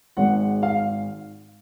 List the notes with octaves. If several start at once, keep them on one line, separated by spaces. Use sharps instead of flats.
G#1 G#2 F#5
F5